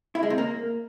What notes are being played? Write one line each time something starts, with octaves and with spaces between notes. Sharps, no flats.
E4
G#3
C3
A#3